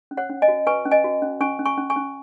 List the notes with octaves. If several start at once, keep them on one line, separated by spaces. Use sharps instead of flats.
C#4
C#5 F#5
C#4
D#5 G#5
F#4
B4 G#5 C#6
C#4
D#5 G#5
F#4
C#4
C#4 G#5 C#6
C#4
G#5 C#6
C#4
G#5 C#6
C#4